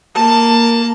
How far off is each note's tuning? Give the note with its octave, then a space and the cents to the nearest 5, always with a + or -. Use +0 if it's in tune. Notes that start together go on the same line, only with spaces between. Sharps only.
A#3 +0 A5 +15